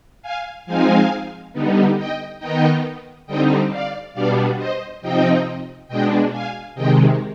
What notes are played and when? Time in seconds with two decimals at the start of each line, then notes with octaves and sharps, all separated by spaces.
0.22 F5 G#5
0.66 F3 G#3 C4 D#4 F5 G#5
1.53 D3 G3 B3 D#4
1.97 D#5 G5
2.40 D#3 B3 D#4 D#5 G5
3.27 D3 G3 C4 D#4 D#5 G5
3.70 D5 F5
4.14 B2 G3 B3 D4 D5 F5
4.57 C5 D#5
5.01 C3 F3 C4 D#4 D#5 G5
5.88 B2 G#3 D4 D#5 G5
6.32 F5 G#5
6.75 C3 D#3 G#3 D#5 G5